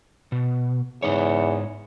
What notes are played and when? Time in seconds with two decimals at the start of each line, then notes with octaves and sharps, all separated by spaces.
0.32 B2
1.03 E2 G#2 D#4 C#5